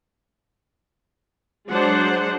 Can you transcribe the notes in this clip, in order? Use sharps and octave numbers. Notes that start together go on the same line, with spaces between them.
F#3 G#3 D4 C5 F#5